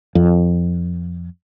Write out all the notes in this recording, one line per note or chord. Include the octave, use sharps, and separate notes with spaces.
F2